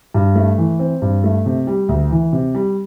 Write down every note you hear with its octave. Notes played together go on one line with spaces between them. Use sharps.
G2
A3
E3
C4
G2
A3
C3
G3
D2
E3
C3
G3